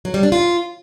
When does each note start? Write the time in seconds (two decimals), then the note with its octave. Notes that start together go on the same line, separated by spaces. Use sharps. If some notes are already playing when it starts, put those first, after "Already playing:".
0.05 F#3
0.14 G3
0.23 D4
0.32 F4